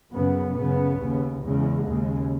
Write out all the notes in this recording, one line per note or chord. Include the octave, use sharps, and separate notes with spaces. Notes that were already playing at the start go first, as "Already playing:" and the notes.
F#2 C#3 B3
F#2 C#3 B3
D#2 C#3
E2 C#3 G#3
D#2 C#3